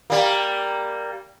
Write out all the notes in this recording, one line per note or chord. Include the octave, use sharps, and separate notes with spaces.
G3 A#3